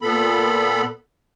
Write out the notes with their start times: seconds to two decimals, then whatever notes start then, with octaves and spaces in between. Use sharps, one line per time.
0.02 A#2 B3 A4 B5